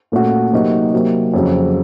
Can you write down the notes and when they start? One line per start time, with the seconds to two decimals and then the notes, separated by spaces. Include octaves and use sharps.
0.12 A#2 A3 C#4 F#4
0.53 C3 F#3 A#3 D#4 F#4
0.93 C3 F#3 A#3
1.34 F2 C#3 F#3